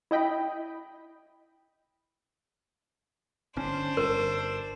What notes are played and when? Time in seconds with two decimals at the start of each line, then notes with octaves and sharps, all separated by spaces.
0.11 E4 D#5 G5 B5
3.56 G1 D3 C#4 D4 C5
3.97 G1 G2 A#4